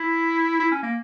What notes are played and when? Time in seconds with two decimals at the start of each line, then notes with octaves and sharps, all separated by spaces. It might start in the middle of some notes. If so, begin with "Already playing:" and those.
Already playing: E4
0.59 E4
0.71 C#4
0.83 A#3